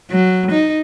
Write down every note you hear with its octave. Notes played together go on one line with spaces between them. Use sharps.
F#3
D#4